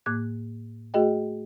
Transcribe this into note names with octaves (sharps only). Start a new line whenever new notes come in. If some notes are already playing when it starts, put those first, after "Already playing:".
A2 A#3 D6 F#6 G#6
A3 F#4 G#4 D#5 G5